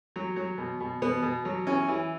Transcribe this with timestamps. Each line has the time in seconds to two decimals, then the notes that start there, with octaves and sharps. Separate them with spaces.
0.16 F#3
0.36 F#3
0.58 B2
0.80 B2
1.02 B2 B3
1.23 B2
1.45 F#3
1.67 E3 C#4
1.88 E3